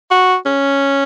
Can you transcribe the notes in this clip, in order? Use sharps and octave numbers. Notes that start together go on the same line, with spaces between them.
F#4
C#4